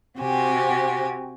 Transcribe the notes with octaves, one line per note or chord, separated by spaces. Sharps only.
C3 C4 F#4 G4 G#5